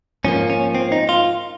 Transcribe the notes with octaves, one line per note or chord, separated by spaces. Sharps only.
G#2 F3 A#3 C#4
C#4
C4
D#4
F4